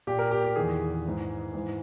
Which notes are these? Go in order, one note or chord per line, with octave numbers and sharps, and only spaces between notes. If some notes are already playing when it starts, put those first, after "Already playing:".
A#2 G4
A#4
G4
G4
E2 D#3 G#4
G#2 E3
G#2 E3